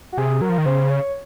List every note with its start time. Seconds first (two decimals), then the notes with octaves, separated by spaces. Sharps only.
0.12 F#4
0.17 C3 G#4
0.41 F#3 A#4
0.50 F3
0.58 D#3
0.66 C#3 C5
0.90 C#5